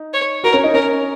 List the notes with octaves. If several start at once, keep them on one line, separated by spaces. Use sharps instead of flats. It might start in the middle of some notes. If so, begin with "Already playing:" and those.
Already playing: D#4
C#5
F#4 A#4
C#4
D#4
C#4 A#4